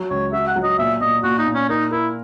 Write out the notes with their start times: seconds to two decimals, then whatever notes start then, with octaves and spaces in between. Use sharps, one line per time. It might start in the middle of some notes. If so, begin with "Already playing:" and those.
Already playing: F#3 F#4
0.10 C#2 C#5
0.33 F#4 E5
0.48 F#5
0.56 F#3
0.63 D#5
0.79 A#2 E5
1.01 A#2 D#5
1.23 A#2 F#4
1.38 D#4
1.46 A#2
1.54 C#4
1.69 D#4 A#4
1.91 E4 A#4